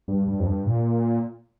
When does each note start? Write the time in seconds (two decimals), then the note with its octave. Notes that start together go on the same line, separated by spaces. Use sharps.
0.08 G2
0.28 G2
0.40 F2
0.46 G2
0.66 A#2